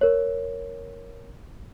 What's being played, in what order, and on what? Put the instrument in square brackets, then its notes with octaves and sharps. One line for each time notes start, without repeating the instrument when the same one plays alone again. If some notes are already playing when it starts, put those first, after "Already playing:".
[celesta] A#4 C#5